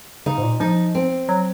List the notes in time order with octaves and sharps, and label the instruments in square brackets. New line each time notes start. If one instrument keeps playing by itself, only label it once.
[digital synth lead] C#3 [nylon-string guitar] D#4
[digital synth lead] G#2
A#2
[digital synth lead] F3 [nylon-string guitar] D#4
[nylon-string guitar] C4
[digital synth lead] F#3